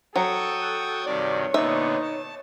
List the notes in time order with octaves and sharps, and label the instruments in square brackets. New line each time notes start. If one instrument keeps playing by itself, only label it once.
[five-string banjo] F#3 [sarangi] A4 [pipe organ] G5 C#6 D#6
[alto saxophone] F#5
[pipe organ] G2 C3 D#3 [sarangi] C#5 [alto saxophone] D5
[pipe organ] A#2 D3 B3 [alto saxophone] D#4 [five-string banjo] E5
[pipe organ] A5